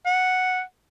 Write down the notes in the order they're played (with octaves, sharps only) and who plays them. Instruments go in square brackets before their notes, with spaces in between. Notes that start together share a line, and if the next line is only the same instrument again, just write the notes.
[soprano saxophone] F#5